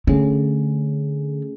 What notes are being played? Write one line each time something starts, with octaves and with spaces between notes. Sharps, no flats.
D3 A3 C#4 G#4